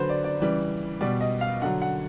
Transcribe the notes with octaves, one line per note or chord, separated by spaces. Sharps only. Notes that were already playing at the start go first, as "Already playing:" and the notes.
Already playing: D3 F#3 B4 C5
D5
D5
C#3 E3 G3
B2 G3 D5
D#5
F5
D3 F#3 F#5
F#5